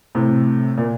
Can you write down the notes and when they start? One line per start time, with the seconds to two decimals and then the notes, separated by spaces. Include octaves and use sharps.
0.15 A2 C3
0.77 A#2